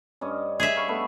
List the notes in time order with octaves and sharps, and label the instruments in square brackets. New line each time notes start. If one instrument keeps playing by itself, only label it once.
[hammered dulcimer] G2 C#4 D#5
[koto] G#4 E5
[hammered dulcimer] F5 B5 C#6
A3 B3